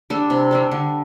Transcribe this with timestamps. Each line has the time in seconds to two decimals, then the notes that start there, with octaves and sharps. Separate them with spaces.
0.10 G3 D4 A4
0.30 C3
0.51 G3 D4 A4
0.72 D3